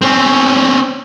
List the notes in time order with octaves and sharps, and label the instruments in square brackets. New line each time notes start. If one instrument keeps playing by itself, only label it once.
[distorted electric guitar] C4 C#4